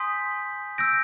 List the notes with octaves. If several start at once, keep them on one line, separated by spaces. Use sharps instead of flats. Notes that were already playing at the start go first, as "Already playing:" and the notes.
Already playing: G#5 C6 D#6 G6 B6
E6 G6 A#6 D7